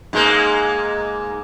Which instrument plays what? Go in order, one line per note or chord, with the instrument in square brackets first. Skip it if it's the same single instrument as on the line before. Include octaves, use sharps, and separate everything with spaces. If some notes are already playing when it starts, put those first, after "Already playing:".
[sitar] G#2 G#3 A#3